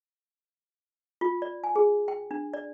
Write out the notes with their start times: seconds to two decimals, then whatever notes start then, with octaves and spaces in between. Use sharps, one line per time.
1.21 F4
1.42 D5
1.64 G#5
1.76 G#4
2.08 G5
2.31 D4
2.54 D5